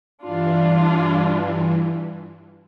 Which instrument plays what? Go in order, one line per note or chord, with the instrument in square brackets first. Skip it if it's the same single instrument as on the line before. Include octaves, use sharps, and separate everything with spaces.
[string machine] G2 E3 [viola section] D4 F4